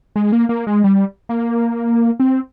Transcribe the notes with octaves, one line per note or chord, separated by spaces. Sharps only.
G#3
A#3
A#3
G#3
G3
A#3
C4